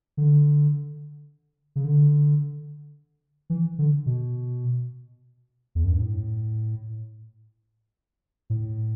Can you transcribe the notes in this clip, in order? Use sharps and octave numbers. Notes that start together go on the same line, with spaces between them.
D3
C#3
D3
E3
D3
B2
E2
F#2
G2
A2
A2